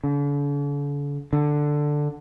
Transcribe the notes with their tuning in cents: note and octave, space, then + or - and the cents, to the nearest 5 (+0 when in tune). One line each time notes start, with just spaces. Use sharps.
D3 -45
D3 +5